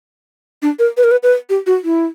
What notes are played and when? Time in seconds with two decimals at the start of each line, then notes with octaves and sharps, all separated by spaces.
0.62 D4
0.79 A#4
0.97 B4
1.04 A#4
1.11 B4
1.23 B4
1.50 G4
1.67 F#4
1.84 E4